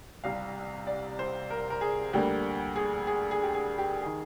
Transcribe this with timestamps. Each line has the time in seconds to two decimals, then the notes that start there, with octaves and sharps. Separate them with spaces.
0.24 C2 C3 G3 F5
0.87 D5
1.19 C5
1.50 A#4
1.70 A#4
1.81 G#4
2.13 D2 D3 G3 A#3 G4
2.76 G#4
3.07 G#4
3.31 G#4
3.43 G4
3.54 G#4
3.78 G4
4.02 D#3 G#4